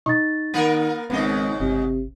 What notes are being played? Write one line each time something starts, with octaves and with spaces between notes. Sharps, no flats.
D#4 C#6 A6
D#3 A#3 A#4 B4
G#1 G#2 C#3 B3 D#5
G1 C3